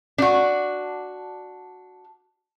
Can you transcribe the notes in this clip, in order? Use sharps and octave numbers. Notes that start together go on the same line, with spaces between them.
D4 F#4